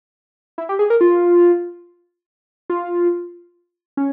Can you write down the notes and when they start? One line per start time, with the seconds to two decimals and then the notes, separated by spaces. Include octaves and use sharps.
0.58 E4
0.69 G4
0.79 G#4
0.90 A#4
1.01 F4
2.70 F4
3.97 C#4